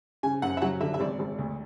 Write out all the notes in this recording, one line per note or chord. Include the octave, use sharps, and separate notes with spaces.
C#3 G#5
F#2 F#5
E5
F#3 F#5
D3 E5
E5
G#1 D5
G#1
D2